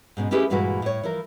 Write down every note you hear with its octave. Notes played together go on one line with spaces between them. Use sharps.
G#2 B2 C#4
A3 C#4 E4 G4 G#4 B4
G2 A#2 E3 G#3 F#4 B4
A2 C#5
E3 F3 A#4